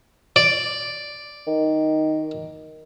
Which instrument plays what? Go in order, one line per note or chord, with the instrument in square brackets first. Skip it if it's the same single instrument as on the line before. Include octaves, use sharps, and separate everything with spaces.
[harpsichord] D5
[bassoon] D#3